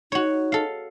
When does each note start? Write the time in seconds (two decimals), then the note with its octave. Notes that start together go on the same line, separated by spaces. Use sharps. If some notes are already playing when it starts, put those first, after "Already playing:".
0.12 D#4 F#4 C#5
0.52 A4 F5